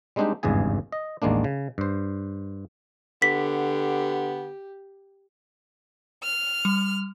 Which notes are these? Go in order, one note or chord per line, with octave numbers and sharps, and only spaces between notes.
G3 G#3 C4 D4 D#4 G4
G#1 E2 G2 C#3 G#4 G#5
D#5
A1 D#2 G#3 A#3 D4
C#3
G2 C5
D3 B3 G4 B6
F6
G3